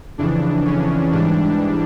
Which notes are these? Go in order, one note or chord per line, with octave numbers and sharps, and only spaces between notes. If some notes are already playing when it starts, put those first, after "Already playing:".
F2 C#3 E3 D4
C#4
G#2 E3 G3 D4